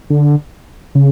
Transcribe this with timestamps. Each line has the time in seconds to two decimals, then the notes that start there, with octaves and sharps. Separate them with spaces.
0.10 D3
0.95 C#3